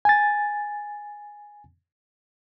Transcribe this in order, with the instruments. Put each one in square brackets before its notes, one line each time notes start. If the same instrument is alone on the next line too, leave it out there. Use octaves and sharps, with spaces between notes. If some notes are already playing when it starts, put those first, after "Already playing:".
[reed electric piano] G#5 A6